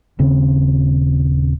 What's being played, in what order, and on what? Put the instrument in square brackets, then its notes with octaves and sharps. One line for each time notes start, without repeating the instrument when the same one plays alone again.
[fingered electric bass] D#1 C#3 C4